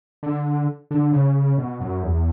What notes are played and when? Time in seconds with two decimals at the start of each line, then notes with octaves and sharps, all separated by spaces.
0.23 D3
0.91 D3
1.12 C#3
1.58 B2
1.81 F#2
2.03 E2